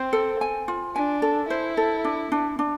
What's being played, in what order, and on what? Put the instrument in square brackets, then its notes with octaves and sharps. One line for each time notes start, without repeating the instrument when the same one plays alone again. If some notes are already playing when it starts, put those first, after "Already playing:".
Already playing: [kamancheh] C4 [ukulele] C5
[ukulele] A4
G#5
F4
[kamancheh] D4 [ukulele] G#5
[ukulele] A4
[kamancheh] E4 [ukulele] C5
[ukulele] A4
D4
D4
D4